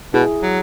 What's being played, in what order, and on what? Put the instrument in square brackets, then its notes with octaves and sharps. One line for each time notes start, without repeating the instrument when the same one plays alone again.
[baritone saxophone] B2 [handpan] E4 G#4
[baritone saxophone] F#3